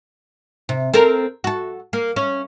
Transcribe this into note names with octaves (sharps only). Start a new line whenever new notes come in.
C3
C4 A4 A#4
F#4 A4
A#3
C#4